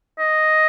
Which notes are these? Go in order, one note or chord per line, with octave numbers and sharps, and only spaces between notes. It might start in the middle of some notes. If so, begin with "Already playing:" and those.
D#5